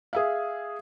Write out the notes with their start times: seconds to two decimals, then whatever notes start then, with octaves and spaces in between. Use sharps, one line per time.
0.13 G#4 E5 F5